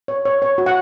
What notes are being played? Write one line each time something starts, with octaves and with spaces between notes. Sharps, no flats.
C#5
C#5
C#5
F#4
F#5